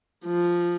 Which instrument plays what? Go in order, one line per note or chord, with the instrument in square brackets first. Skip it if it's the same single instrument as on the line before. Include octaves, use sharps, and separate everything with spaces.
[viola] F3